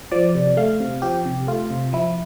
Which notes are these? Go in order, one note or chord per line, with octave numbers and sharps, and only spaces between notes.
F3 D5
C3
A3 F5
C3
F3 G4
C3
A3 F4
C3
F3 E4